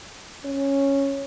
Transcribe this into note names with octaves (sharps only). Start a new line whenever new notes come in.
C#4